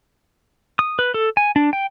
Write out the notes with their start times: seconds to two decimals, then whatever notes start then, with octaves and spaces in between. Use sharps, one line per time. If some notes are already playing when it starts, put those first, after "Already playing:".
0.79 D#6
0.99 B4
1.14 A4
1.37 G#5
1.56 D4
1.73 G5